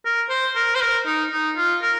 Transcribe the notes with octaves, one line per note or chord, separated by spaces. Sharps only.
A#4
C5
A#4
C5
A#4
D#4
D#4
F4
A#4